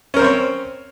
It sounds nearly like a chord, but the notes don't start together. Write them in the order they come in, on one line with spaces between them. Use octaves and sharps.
C#4 A#4 C5 C4 C#5